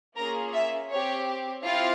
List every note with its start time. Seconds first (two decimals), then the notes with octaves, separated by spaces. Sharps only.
0.16 A#3 C#4 F4 G#4 A#4 A#5
0.53 E5
0.90 C4 G4 C#5
1.63 C4 E4 F4 G4 F5